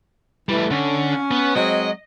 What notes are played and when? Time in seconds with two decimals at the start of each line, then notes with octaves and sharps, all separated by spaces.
0.49 E3 G3 A3
0.71 D3 C#4
1.31 B3
1.55 F#3 G#3 C4 D#5